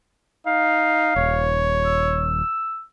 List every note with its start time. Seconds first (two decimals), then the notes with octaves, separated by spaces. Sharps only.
0.46 D#4 F5
1.16 D#1 C#5
1.85 E6